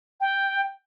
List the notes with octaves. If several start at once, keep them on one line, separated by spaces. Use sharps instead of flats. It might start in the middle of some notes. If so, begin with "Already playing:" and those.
G5